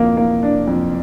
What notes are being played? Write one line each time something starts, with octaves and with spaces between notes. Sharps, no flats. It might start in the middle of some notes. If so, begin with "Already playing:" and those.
Already playing: F2 A#3
A#3
D4
F2